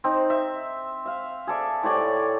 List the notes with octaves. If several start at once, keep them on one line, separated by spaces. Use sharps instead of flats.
C4 D#4
E5
E5 F5
G#4 A4 D5 E5
A2 G4 C#5 D5